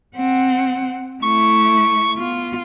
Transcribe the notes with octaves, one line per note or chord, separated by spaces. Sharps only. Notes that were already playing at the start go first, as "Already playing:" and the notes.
C4 F#5
A3 E4 C#6
B3 F4